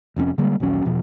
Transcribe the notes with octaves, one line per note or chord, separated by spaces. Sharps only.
F1 F2 C4 C#4
D3 G3 G#3 A#3
A#1 D#2 F#3 C#4
E1 B2 F3